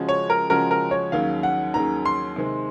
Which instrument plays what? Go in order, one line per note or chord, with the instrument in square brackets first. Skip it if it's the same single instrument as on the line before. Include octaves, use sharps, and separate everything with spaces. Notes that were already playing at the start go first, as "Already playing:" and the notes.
Already playing: [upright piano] C#3 F3 G#3 C#4 F#4
[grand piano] C#5
A#4
[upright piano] C#3 F3 G#3 C#4 F#4 [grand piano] A#4
[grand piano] A#4
C#5
[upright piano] D#2 D#3 F#3 C#4 G#4 [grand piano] F5
[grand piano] F#5
[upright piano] D#2 D#3 F#3 C#4 G#4 [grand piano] A#5
[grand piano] C6
[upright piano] C3 D#3 G#3 C4